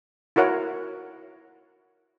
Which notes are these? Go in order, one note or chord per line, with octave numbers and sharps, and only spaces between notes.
E4 F#4 A#4 C#5 F#5